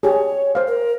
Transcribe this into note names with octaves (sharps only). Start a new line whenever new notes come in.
G4 G#4 C#5
C5 F5
A#4